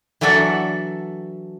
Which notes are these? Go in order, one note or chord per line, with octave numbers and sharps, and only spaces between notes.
E3 F#3 D4 A4 E5 F#5